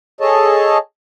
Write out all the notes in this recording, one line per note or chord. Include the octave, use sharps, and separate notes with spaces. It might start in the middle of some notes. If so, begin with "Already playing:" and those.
G#4 A4 C#5 D#5 A5